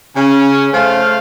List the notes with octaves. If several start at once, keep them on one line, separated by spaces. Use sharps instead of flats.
C#3 C#4
A3 C5 F5